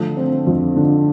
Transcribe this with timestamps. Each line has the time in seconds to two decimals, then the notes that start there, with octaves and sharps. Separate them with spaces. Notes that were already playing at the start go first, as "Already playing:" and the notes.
Already playing: D3 F3 A3
0.17 C4
0.47 F2
0.76 D3